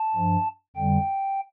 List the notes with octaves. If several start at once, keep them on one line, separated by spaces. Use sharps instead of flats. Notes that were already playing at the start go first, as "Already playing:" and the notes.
Already playing: A5
G2 F3
F2 D3 G3 G5